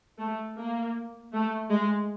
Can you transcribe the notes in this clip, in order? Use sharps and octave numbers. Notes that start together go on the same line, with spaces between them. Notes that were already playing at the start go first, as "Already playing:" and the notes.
A3
A#3
A3
G#3